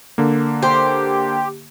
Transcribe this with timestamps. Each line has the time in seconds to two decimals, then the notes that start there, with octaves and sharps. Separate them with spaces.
0.18 D3 A#3
0.62 G4 C5